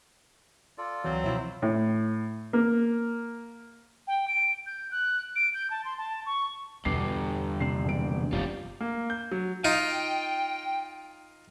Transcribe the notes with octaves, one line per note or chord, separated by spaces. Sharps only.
F4 A4 D5
C#2 E3 F#3 C4
B2 F3 E4 F4 C5 C#5 E5
A2
A#3
G5
D7
G6
F#6
D7
G6
A5
C6
A5
C#6
E2 G2 B2 D3 D6 C7
D#2 C3 D4 C7
E1 D7
F#1 G3 F4
A#3
G6
F#3
D#4 F4 G5